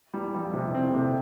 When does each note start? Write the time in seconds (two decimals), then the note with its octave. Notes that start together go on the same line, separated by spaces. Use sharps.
0.14 E2 E3 G3
0.34 F2 F3 G3
0.53 F2 C3 F3
0.68 G2 G3
0.75 C4
0.84 A2 A3
0.94 C3
0.99 D3